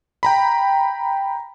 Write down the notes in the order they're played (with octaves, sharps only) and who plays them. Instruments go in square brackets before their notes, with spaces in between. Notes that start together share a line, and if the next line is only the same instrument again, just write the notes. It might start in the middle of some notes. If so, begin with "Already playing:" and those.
[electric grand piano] G5 A#5 B5